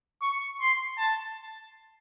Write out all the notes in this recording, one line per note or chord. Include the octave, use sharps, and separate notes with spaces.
C#6
C6
A5